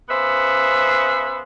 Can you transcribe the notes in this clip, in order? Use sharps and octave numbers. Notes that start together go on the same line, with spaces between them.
C#3 B3 C5 E5